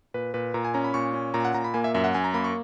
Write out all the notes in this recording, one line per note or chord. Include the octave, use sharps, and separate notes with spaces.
A#2 B4
A#2 B4
A#2 A#5
G#5
C#4 A#5
B5
A#2 C#6
C#4
A#2 A#5
F#5
A#2 A#5
B5
A#3 G#5
E5
F#2 E5
F#5
F#2 G#5
A#5
A#3 B5
C#6